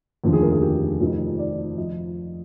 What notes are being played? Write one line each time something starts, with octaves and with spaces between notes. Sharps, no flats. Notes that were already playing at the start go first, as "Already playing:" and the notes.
F1 D#2 D3 F3
G#4
A#4
G#4
G4
F1 F2 D#3
D5
F3 D#5